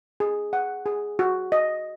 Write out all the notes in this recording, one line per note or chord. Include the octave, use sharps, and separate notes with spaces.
G#4
F#5
G#4
F#4
D#5